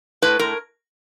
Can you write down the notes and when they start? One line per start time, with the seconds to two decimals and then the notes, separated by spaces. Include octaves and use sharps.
0.22 A2 B4
0.39 A2 A#4